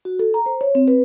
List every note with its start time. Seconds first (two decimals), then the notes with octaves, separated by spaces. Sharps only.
0.05 F#4
0.19 A4
0.34 A#5
0.46 C5
0.61 C#5
0.75 C4
0.88 B4